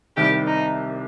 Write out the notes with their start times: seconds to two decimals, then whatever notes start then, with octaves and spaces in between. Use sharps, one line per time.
0.17 C2 C3 D#3 G3 G4
0.47 D#4